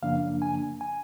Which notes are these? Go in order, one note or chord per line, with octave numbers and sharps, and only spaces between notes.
F#2 C#3 F3 A#3 D4 F5
G#5
G#5